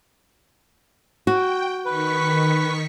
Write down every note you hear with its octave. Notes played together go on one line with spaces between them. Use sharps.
F#4 G5
D#3 B4 C#6 B6